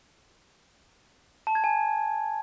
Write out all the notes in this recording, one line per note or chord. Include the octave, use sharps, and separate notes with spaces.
A5
G#6
G#5